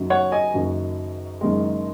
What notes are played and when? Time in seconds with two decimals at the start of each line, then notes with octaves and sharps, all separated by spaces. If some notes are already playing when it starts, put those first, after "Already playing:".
Already playing: F#1 F#2 D#3 F#3
0.10 C#5 F#5
0.32 D#5 G#5
0.54 F#1 F#2 D#3 F#3
1.41 F#1 F#2 D#3 G#3